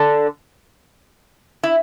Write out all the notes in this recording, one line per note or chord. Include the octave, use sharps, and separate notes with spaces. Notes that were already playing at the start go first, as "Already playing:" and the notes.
Already playing: D3 D4
E4